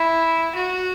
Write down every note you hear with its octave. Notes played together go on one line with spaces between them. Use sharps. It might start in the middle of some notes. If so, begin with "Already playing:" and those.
Already playing: E4
F#4